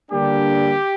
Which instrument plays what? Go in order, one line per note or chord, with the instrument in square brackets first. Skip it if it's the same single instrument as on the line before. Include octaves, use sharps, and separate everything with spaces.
[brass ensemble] D3 G3 A#3 D4 G4